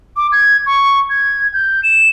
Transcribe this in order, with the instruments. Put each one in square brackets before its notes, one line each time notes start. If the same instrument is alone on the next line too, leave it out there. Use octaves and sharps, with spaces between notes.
[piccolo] D6
G#6
C#6
G#6
G6
E7